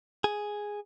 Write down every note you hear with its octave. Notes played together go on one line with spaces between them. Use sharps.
G#4